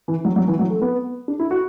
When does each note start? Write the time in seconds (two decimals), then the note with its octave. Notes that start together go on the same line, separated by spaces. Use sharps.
0.08 E3
0.25 F#3
0.36 F#3
0.48 E3
0.59 F#3
0.70 A3
0.82 B3
1.28 D4
1.39 E4
1.51 F#4